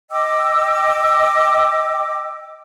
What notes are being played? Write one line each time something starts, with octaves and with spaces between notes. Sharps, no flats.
D#5 G5 D6 E6